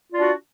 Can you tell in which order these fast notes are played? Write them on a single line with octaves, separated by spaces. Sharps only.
F4 D5 D4 F#4